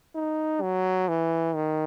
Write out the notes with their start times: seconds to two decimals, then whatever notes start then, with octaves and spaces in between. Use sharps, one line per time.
0.15 D#4
0.62 F#3
1.08 E3
1.55 D#3